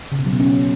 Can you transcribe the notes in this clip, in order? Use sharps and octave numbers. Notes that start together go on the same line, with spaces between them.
C#3
B2
F#3
B2
C#4